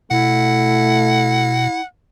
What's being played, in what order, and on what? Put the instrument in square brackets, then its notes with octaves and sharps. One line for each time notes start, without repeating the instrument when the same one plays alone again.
[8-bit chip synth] B2 [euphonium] A3 [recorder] E4 [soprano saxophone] F#5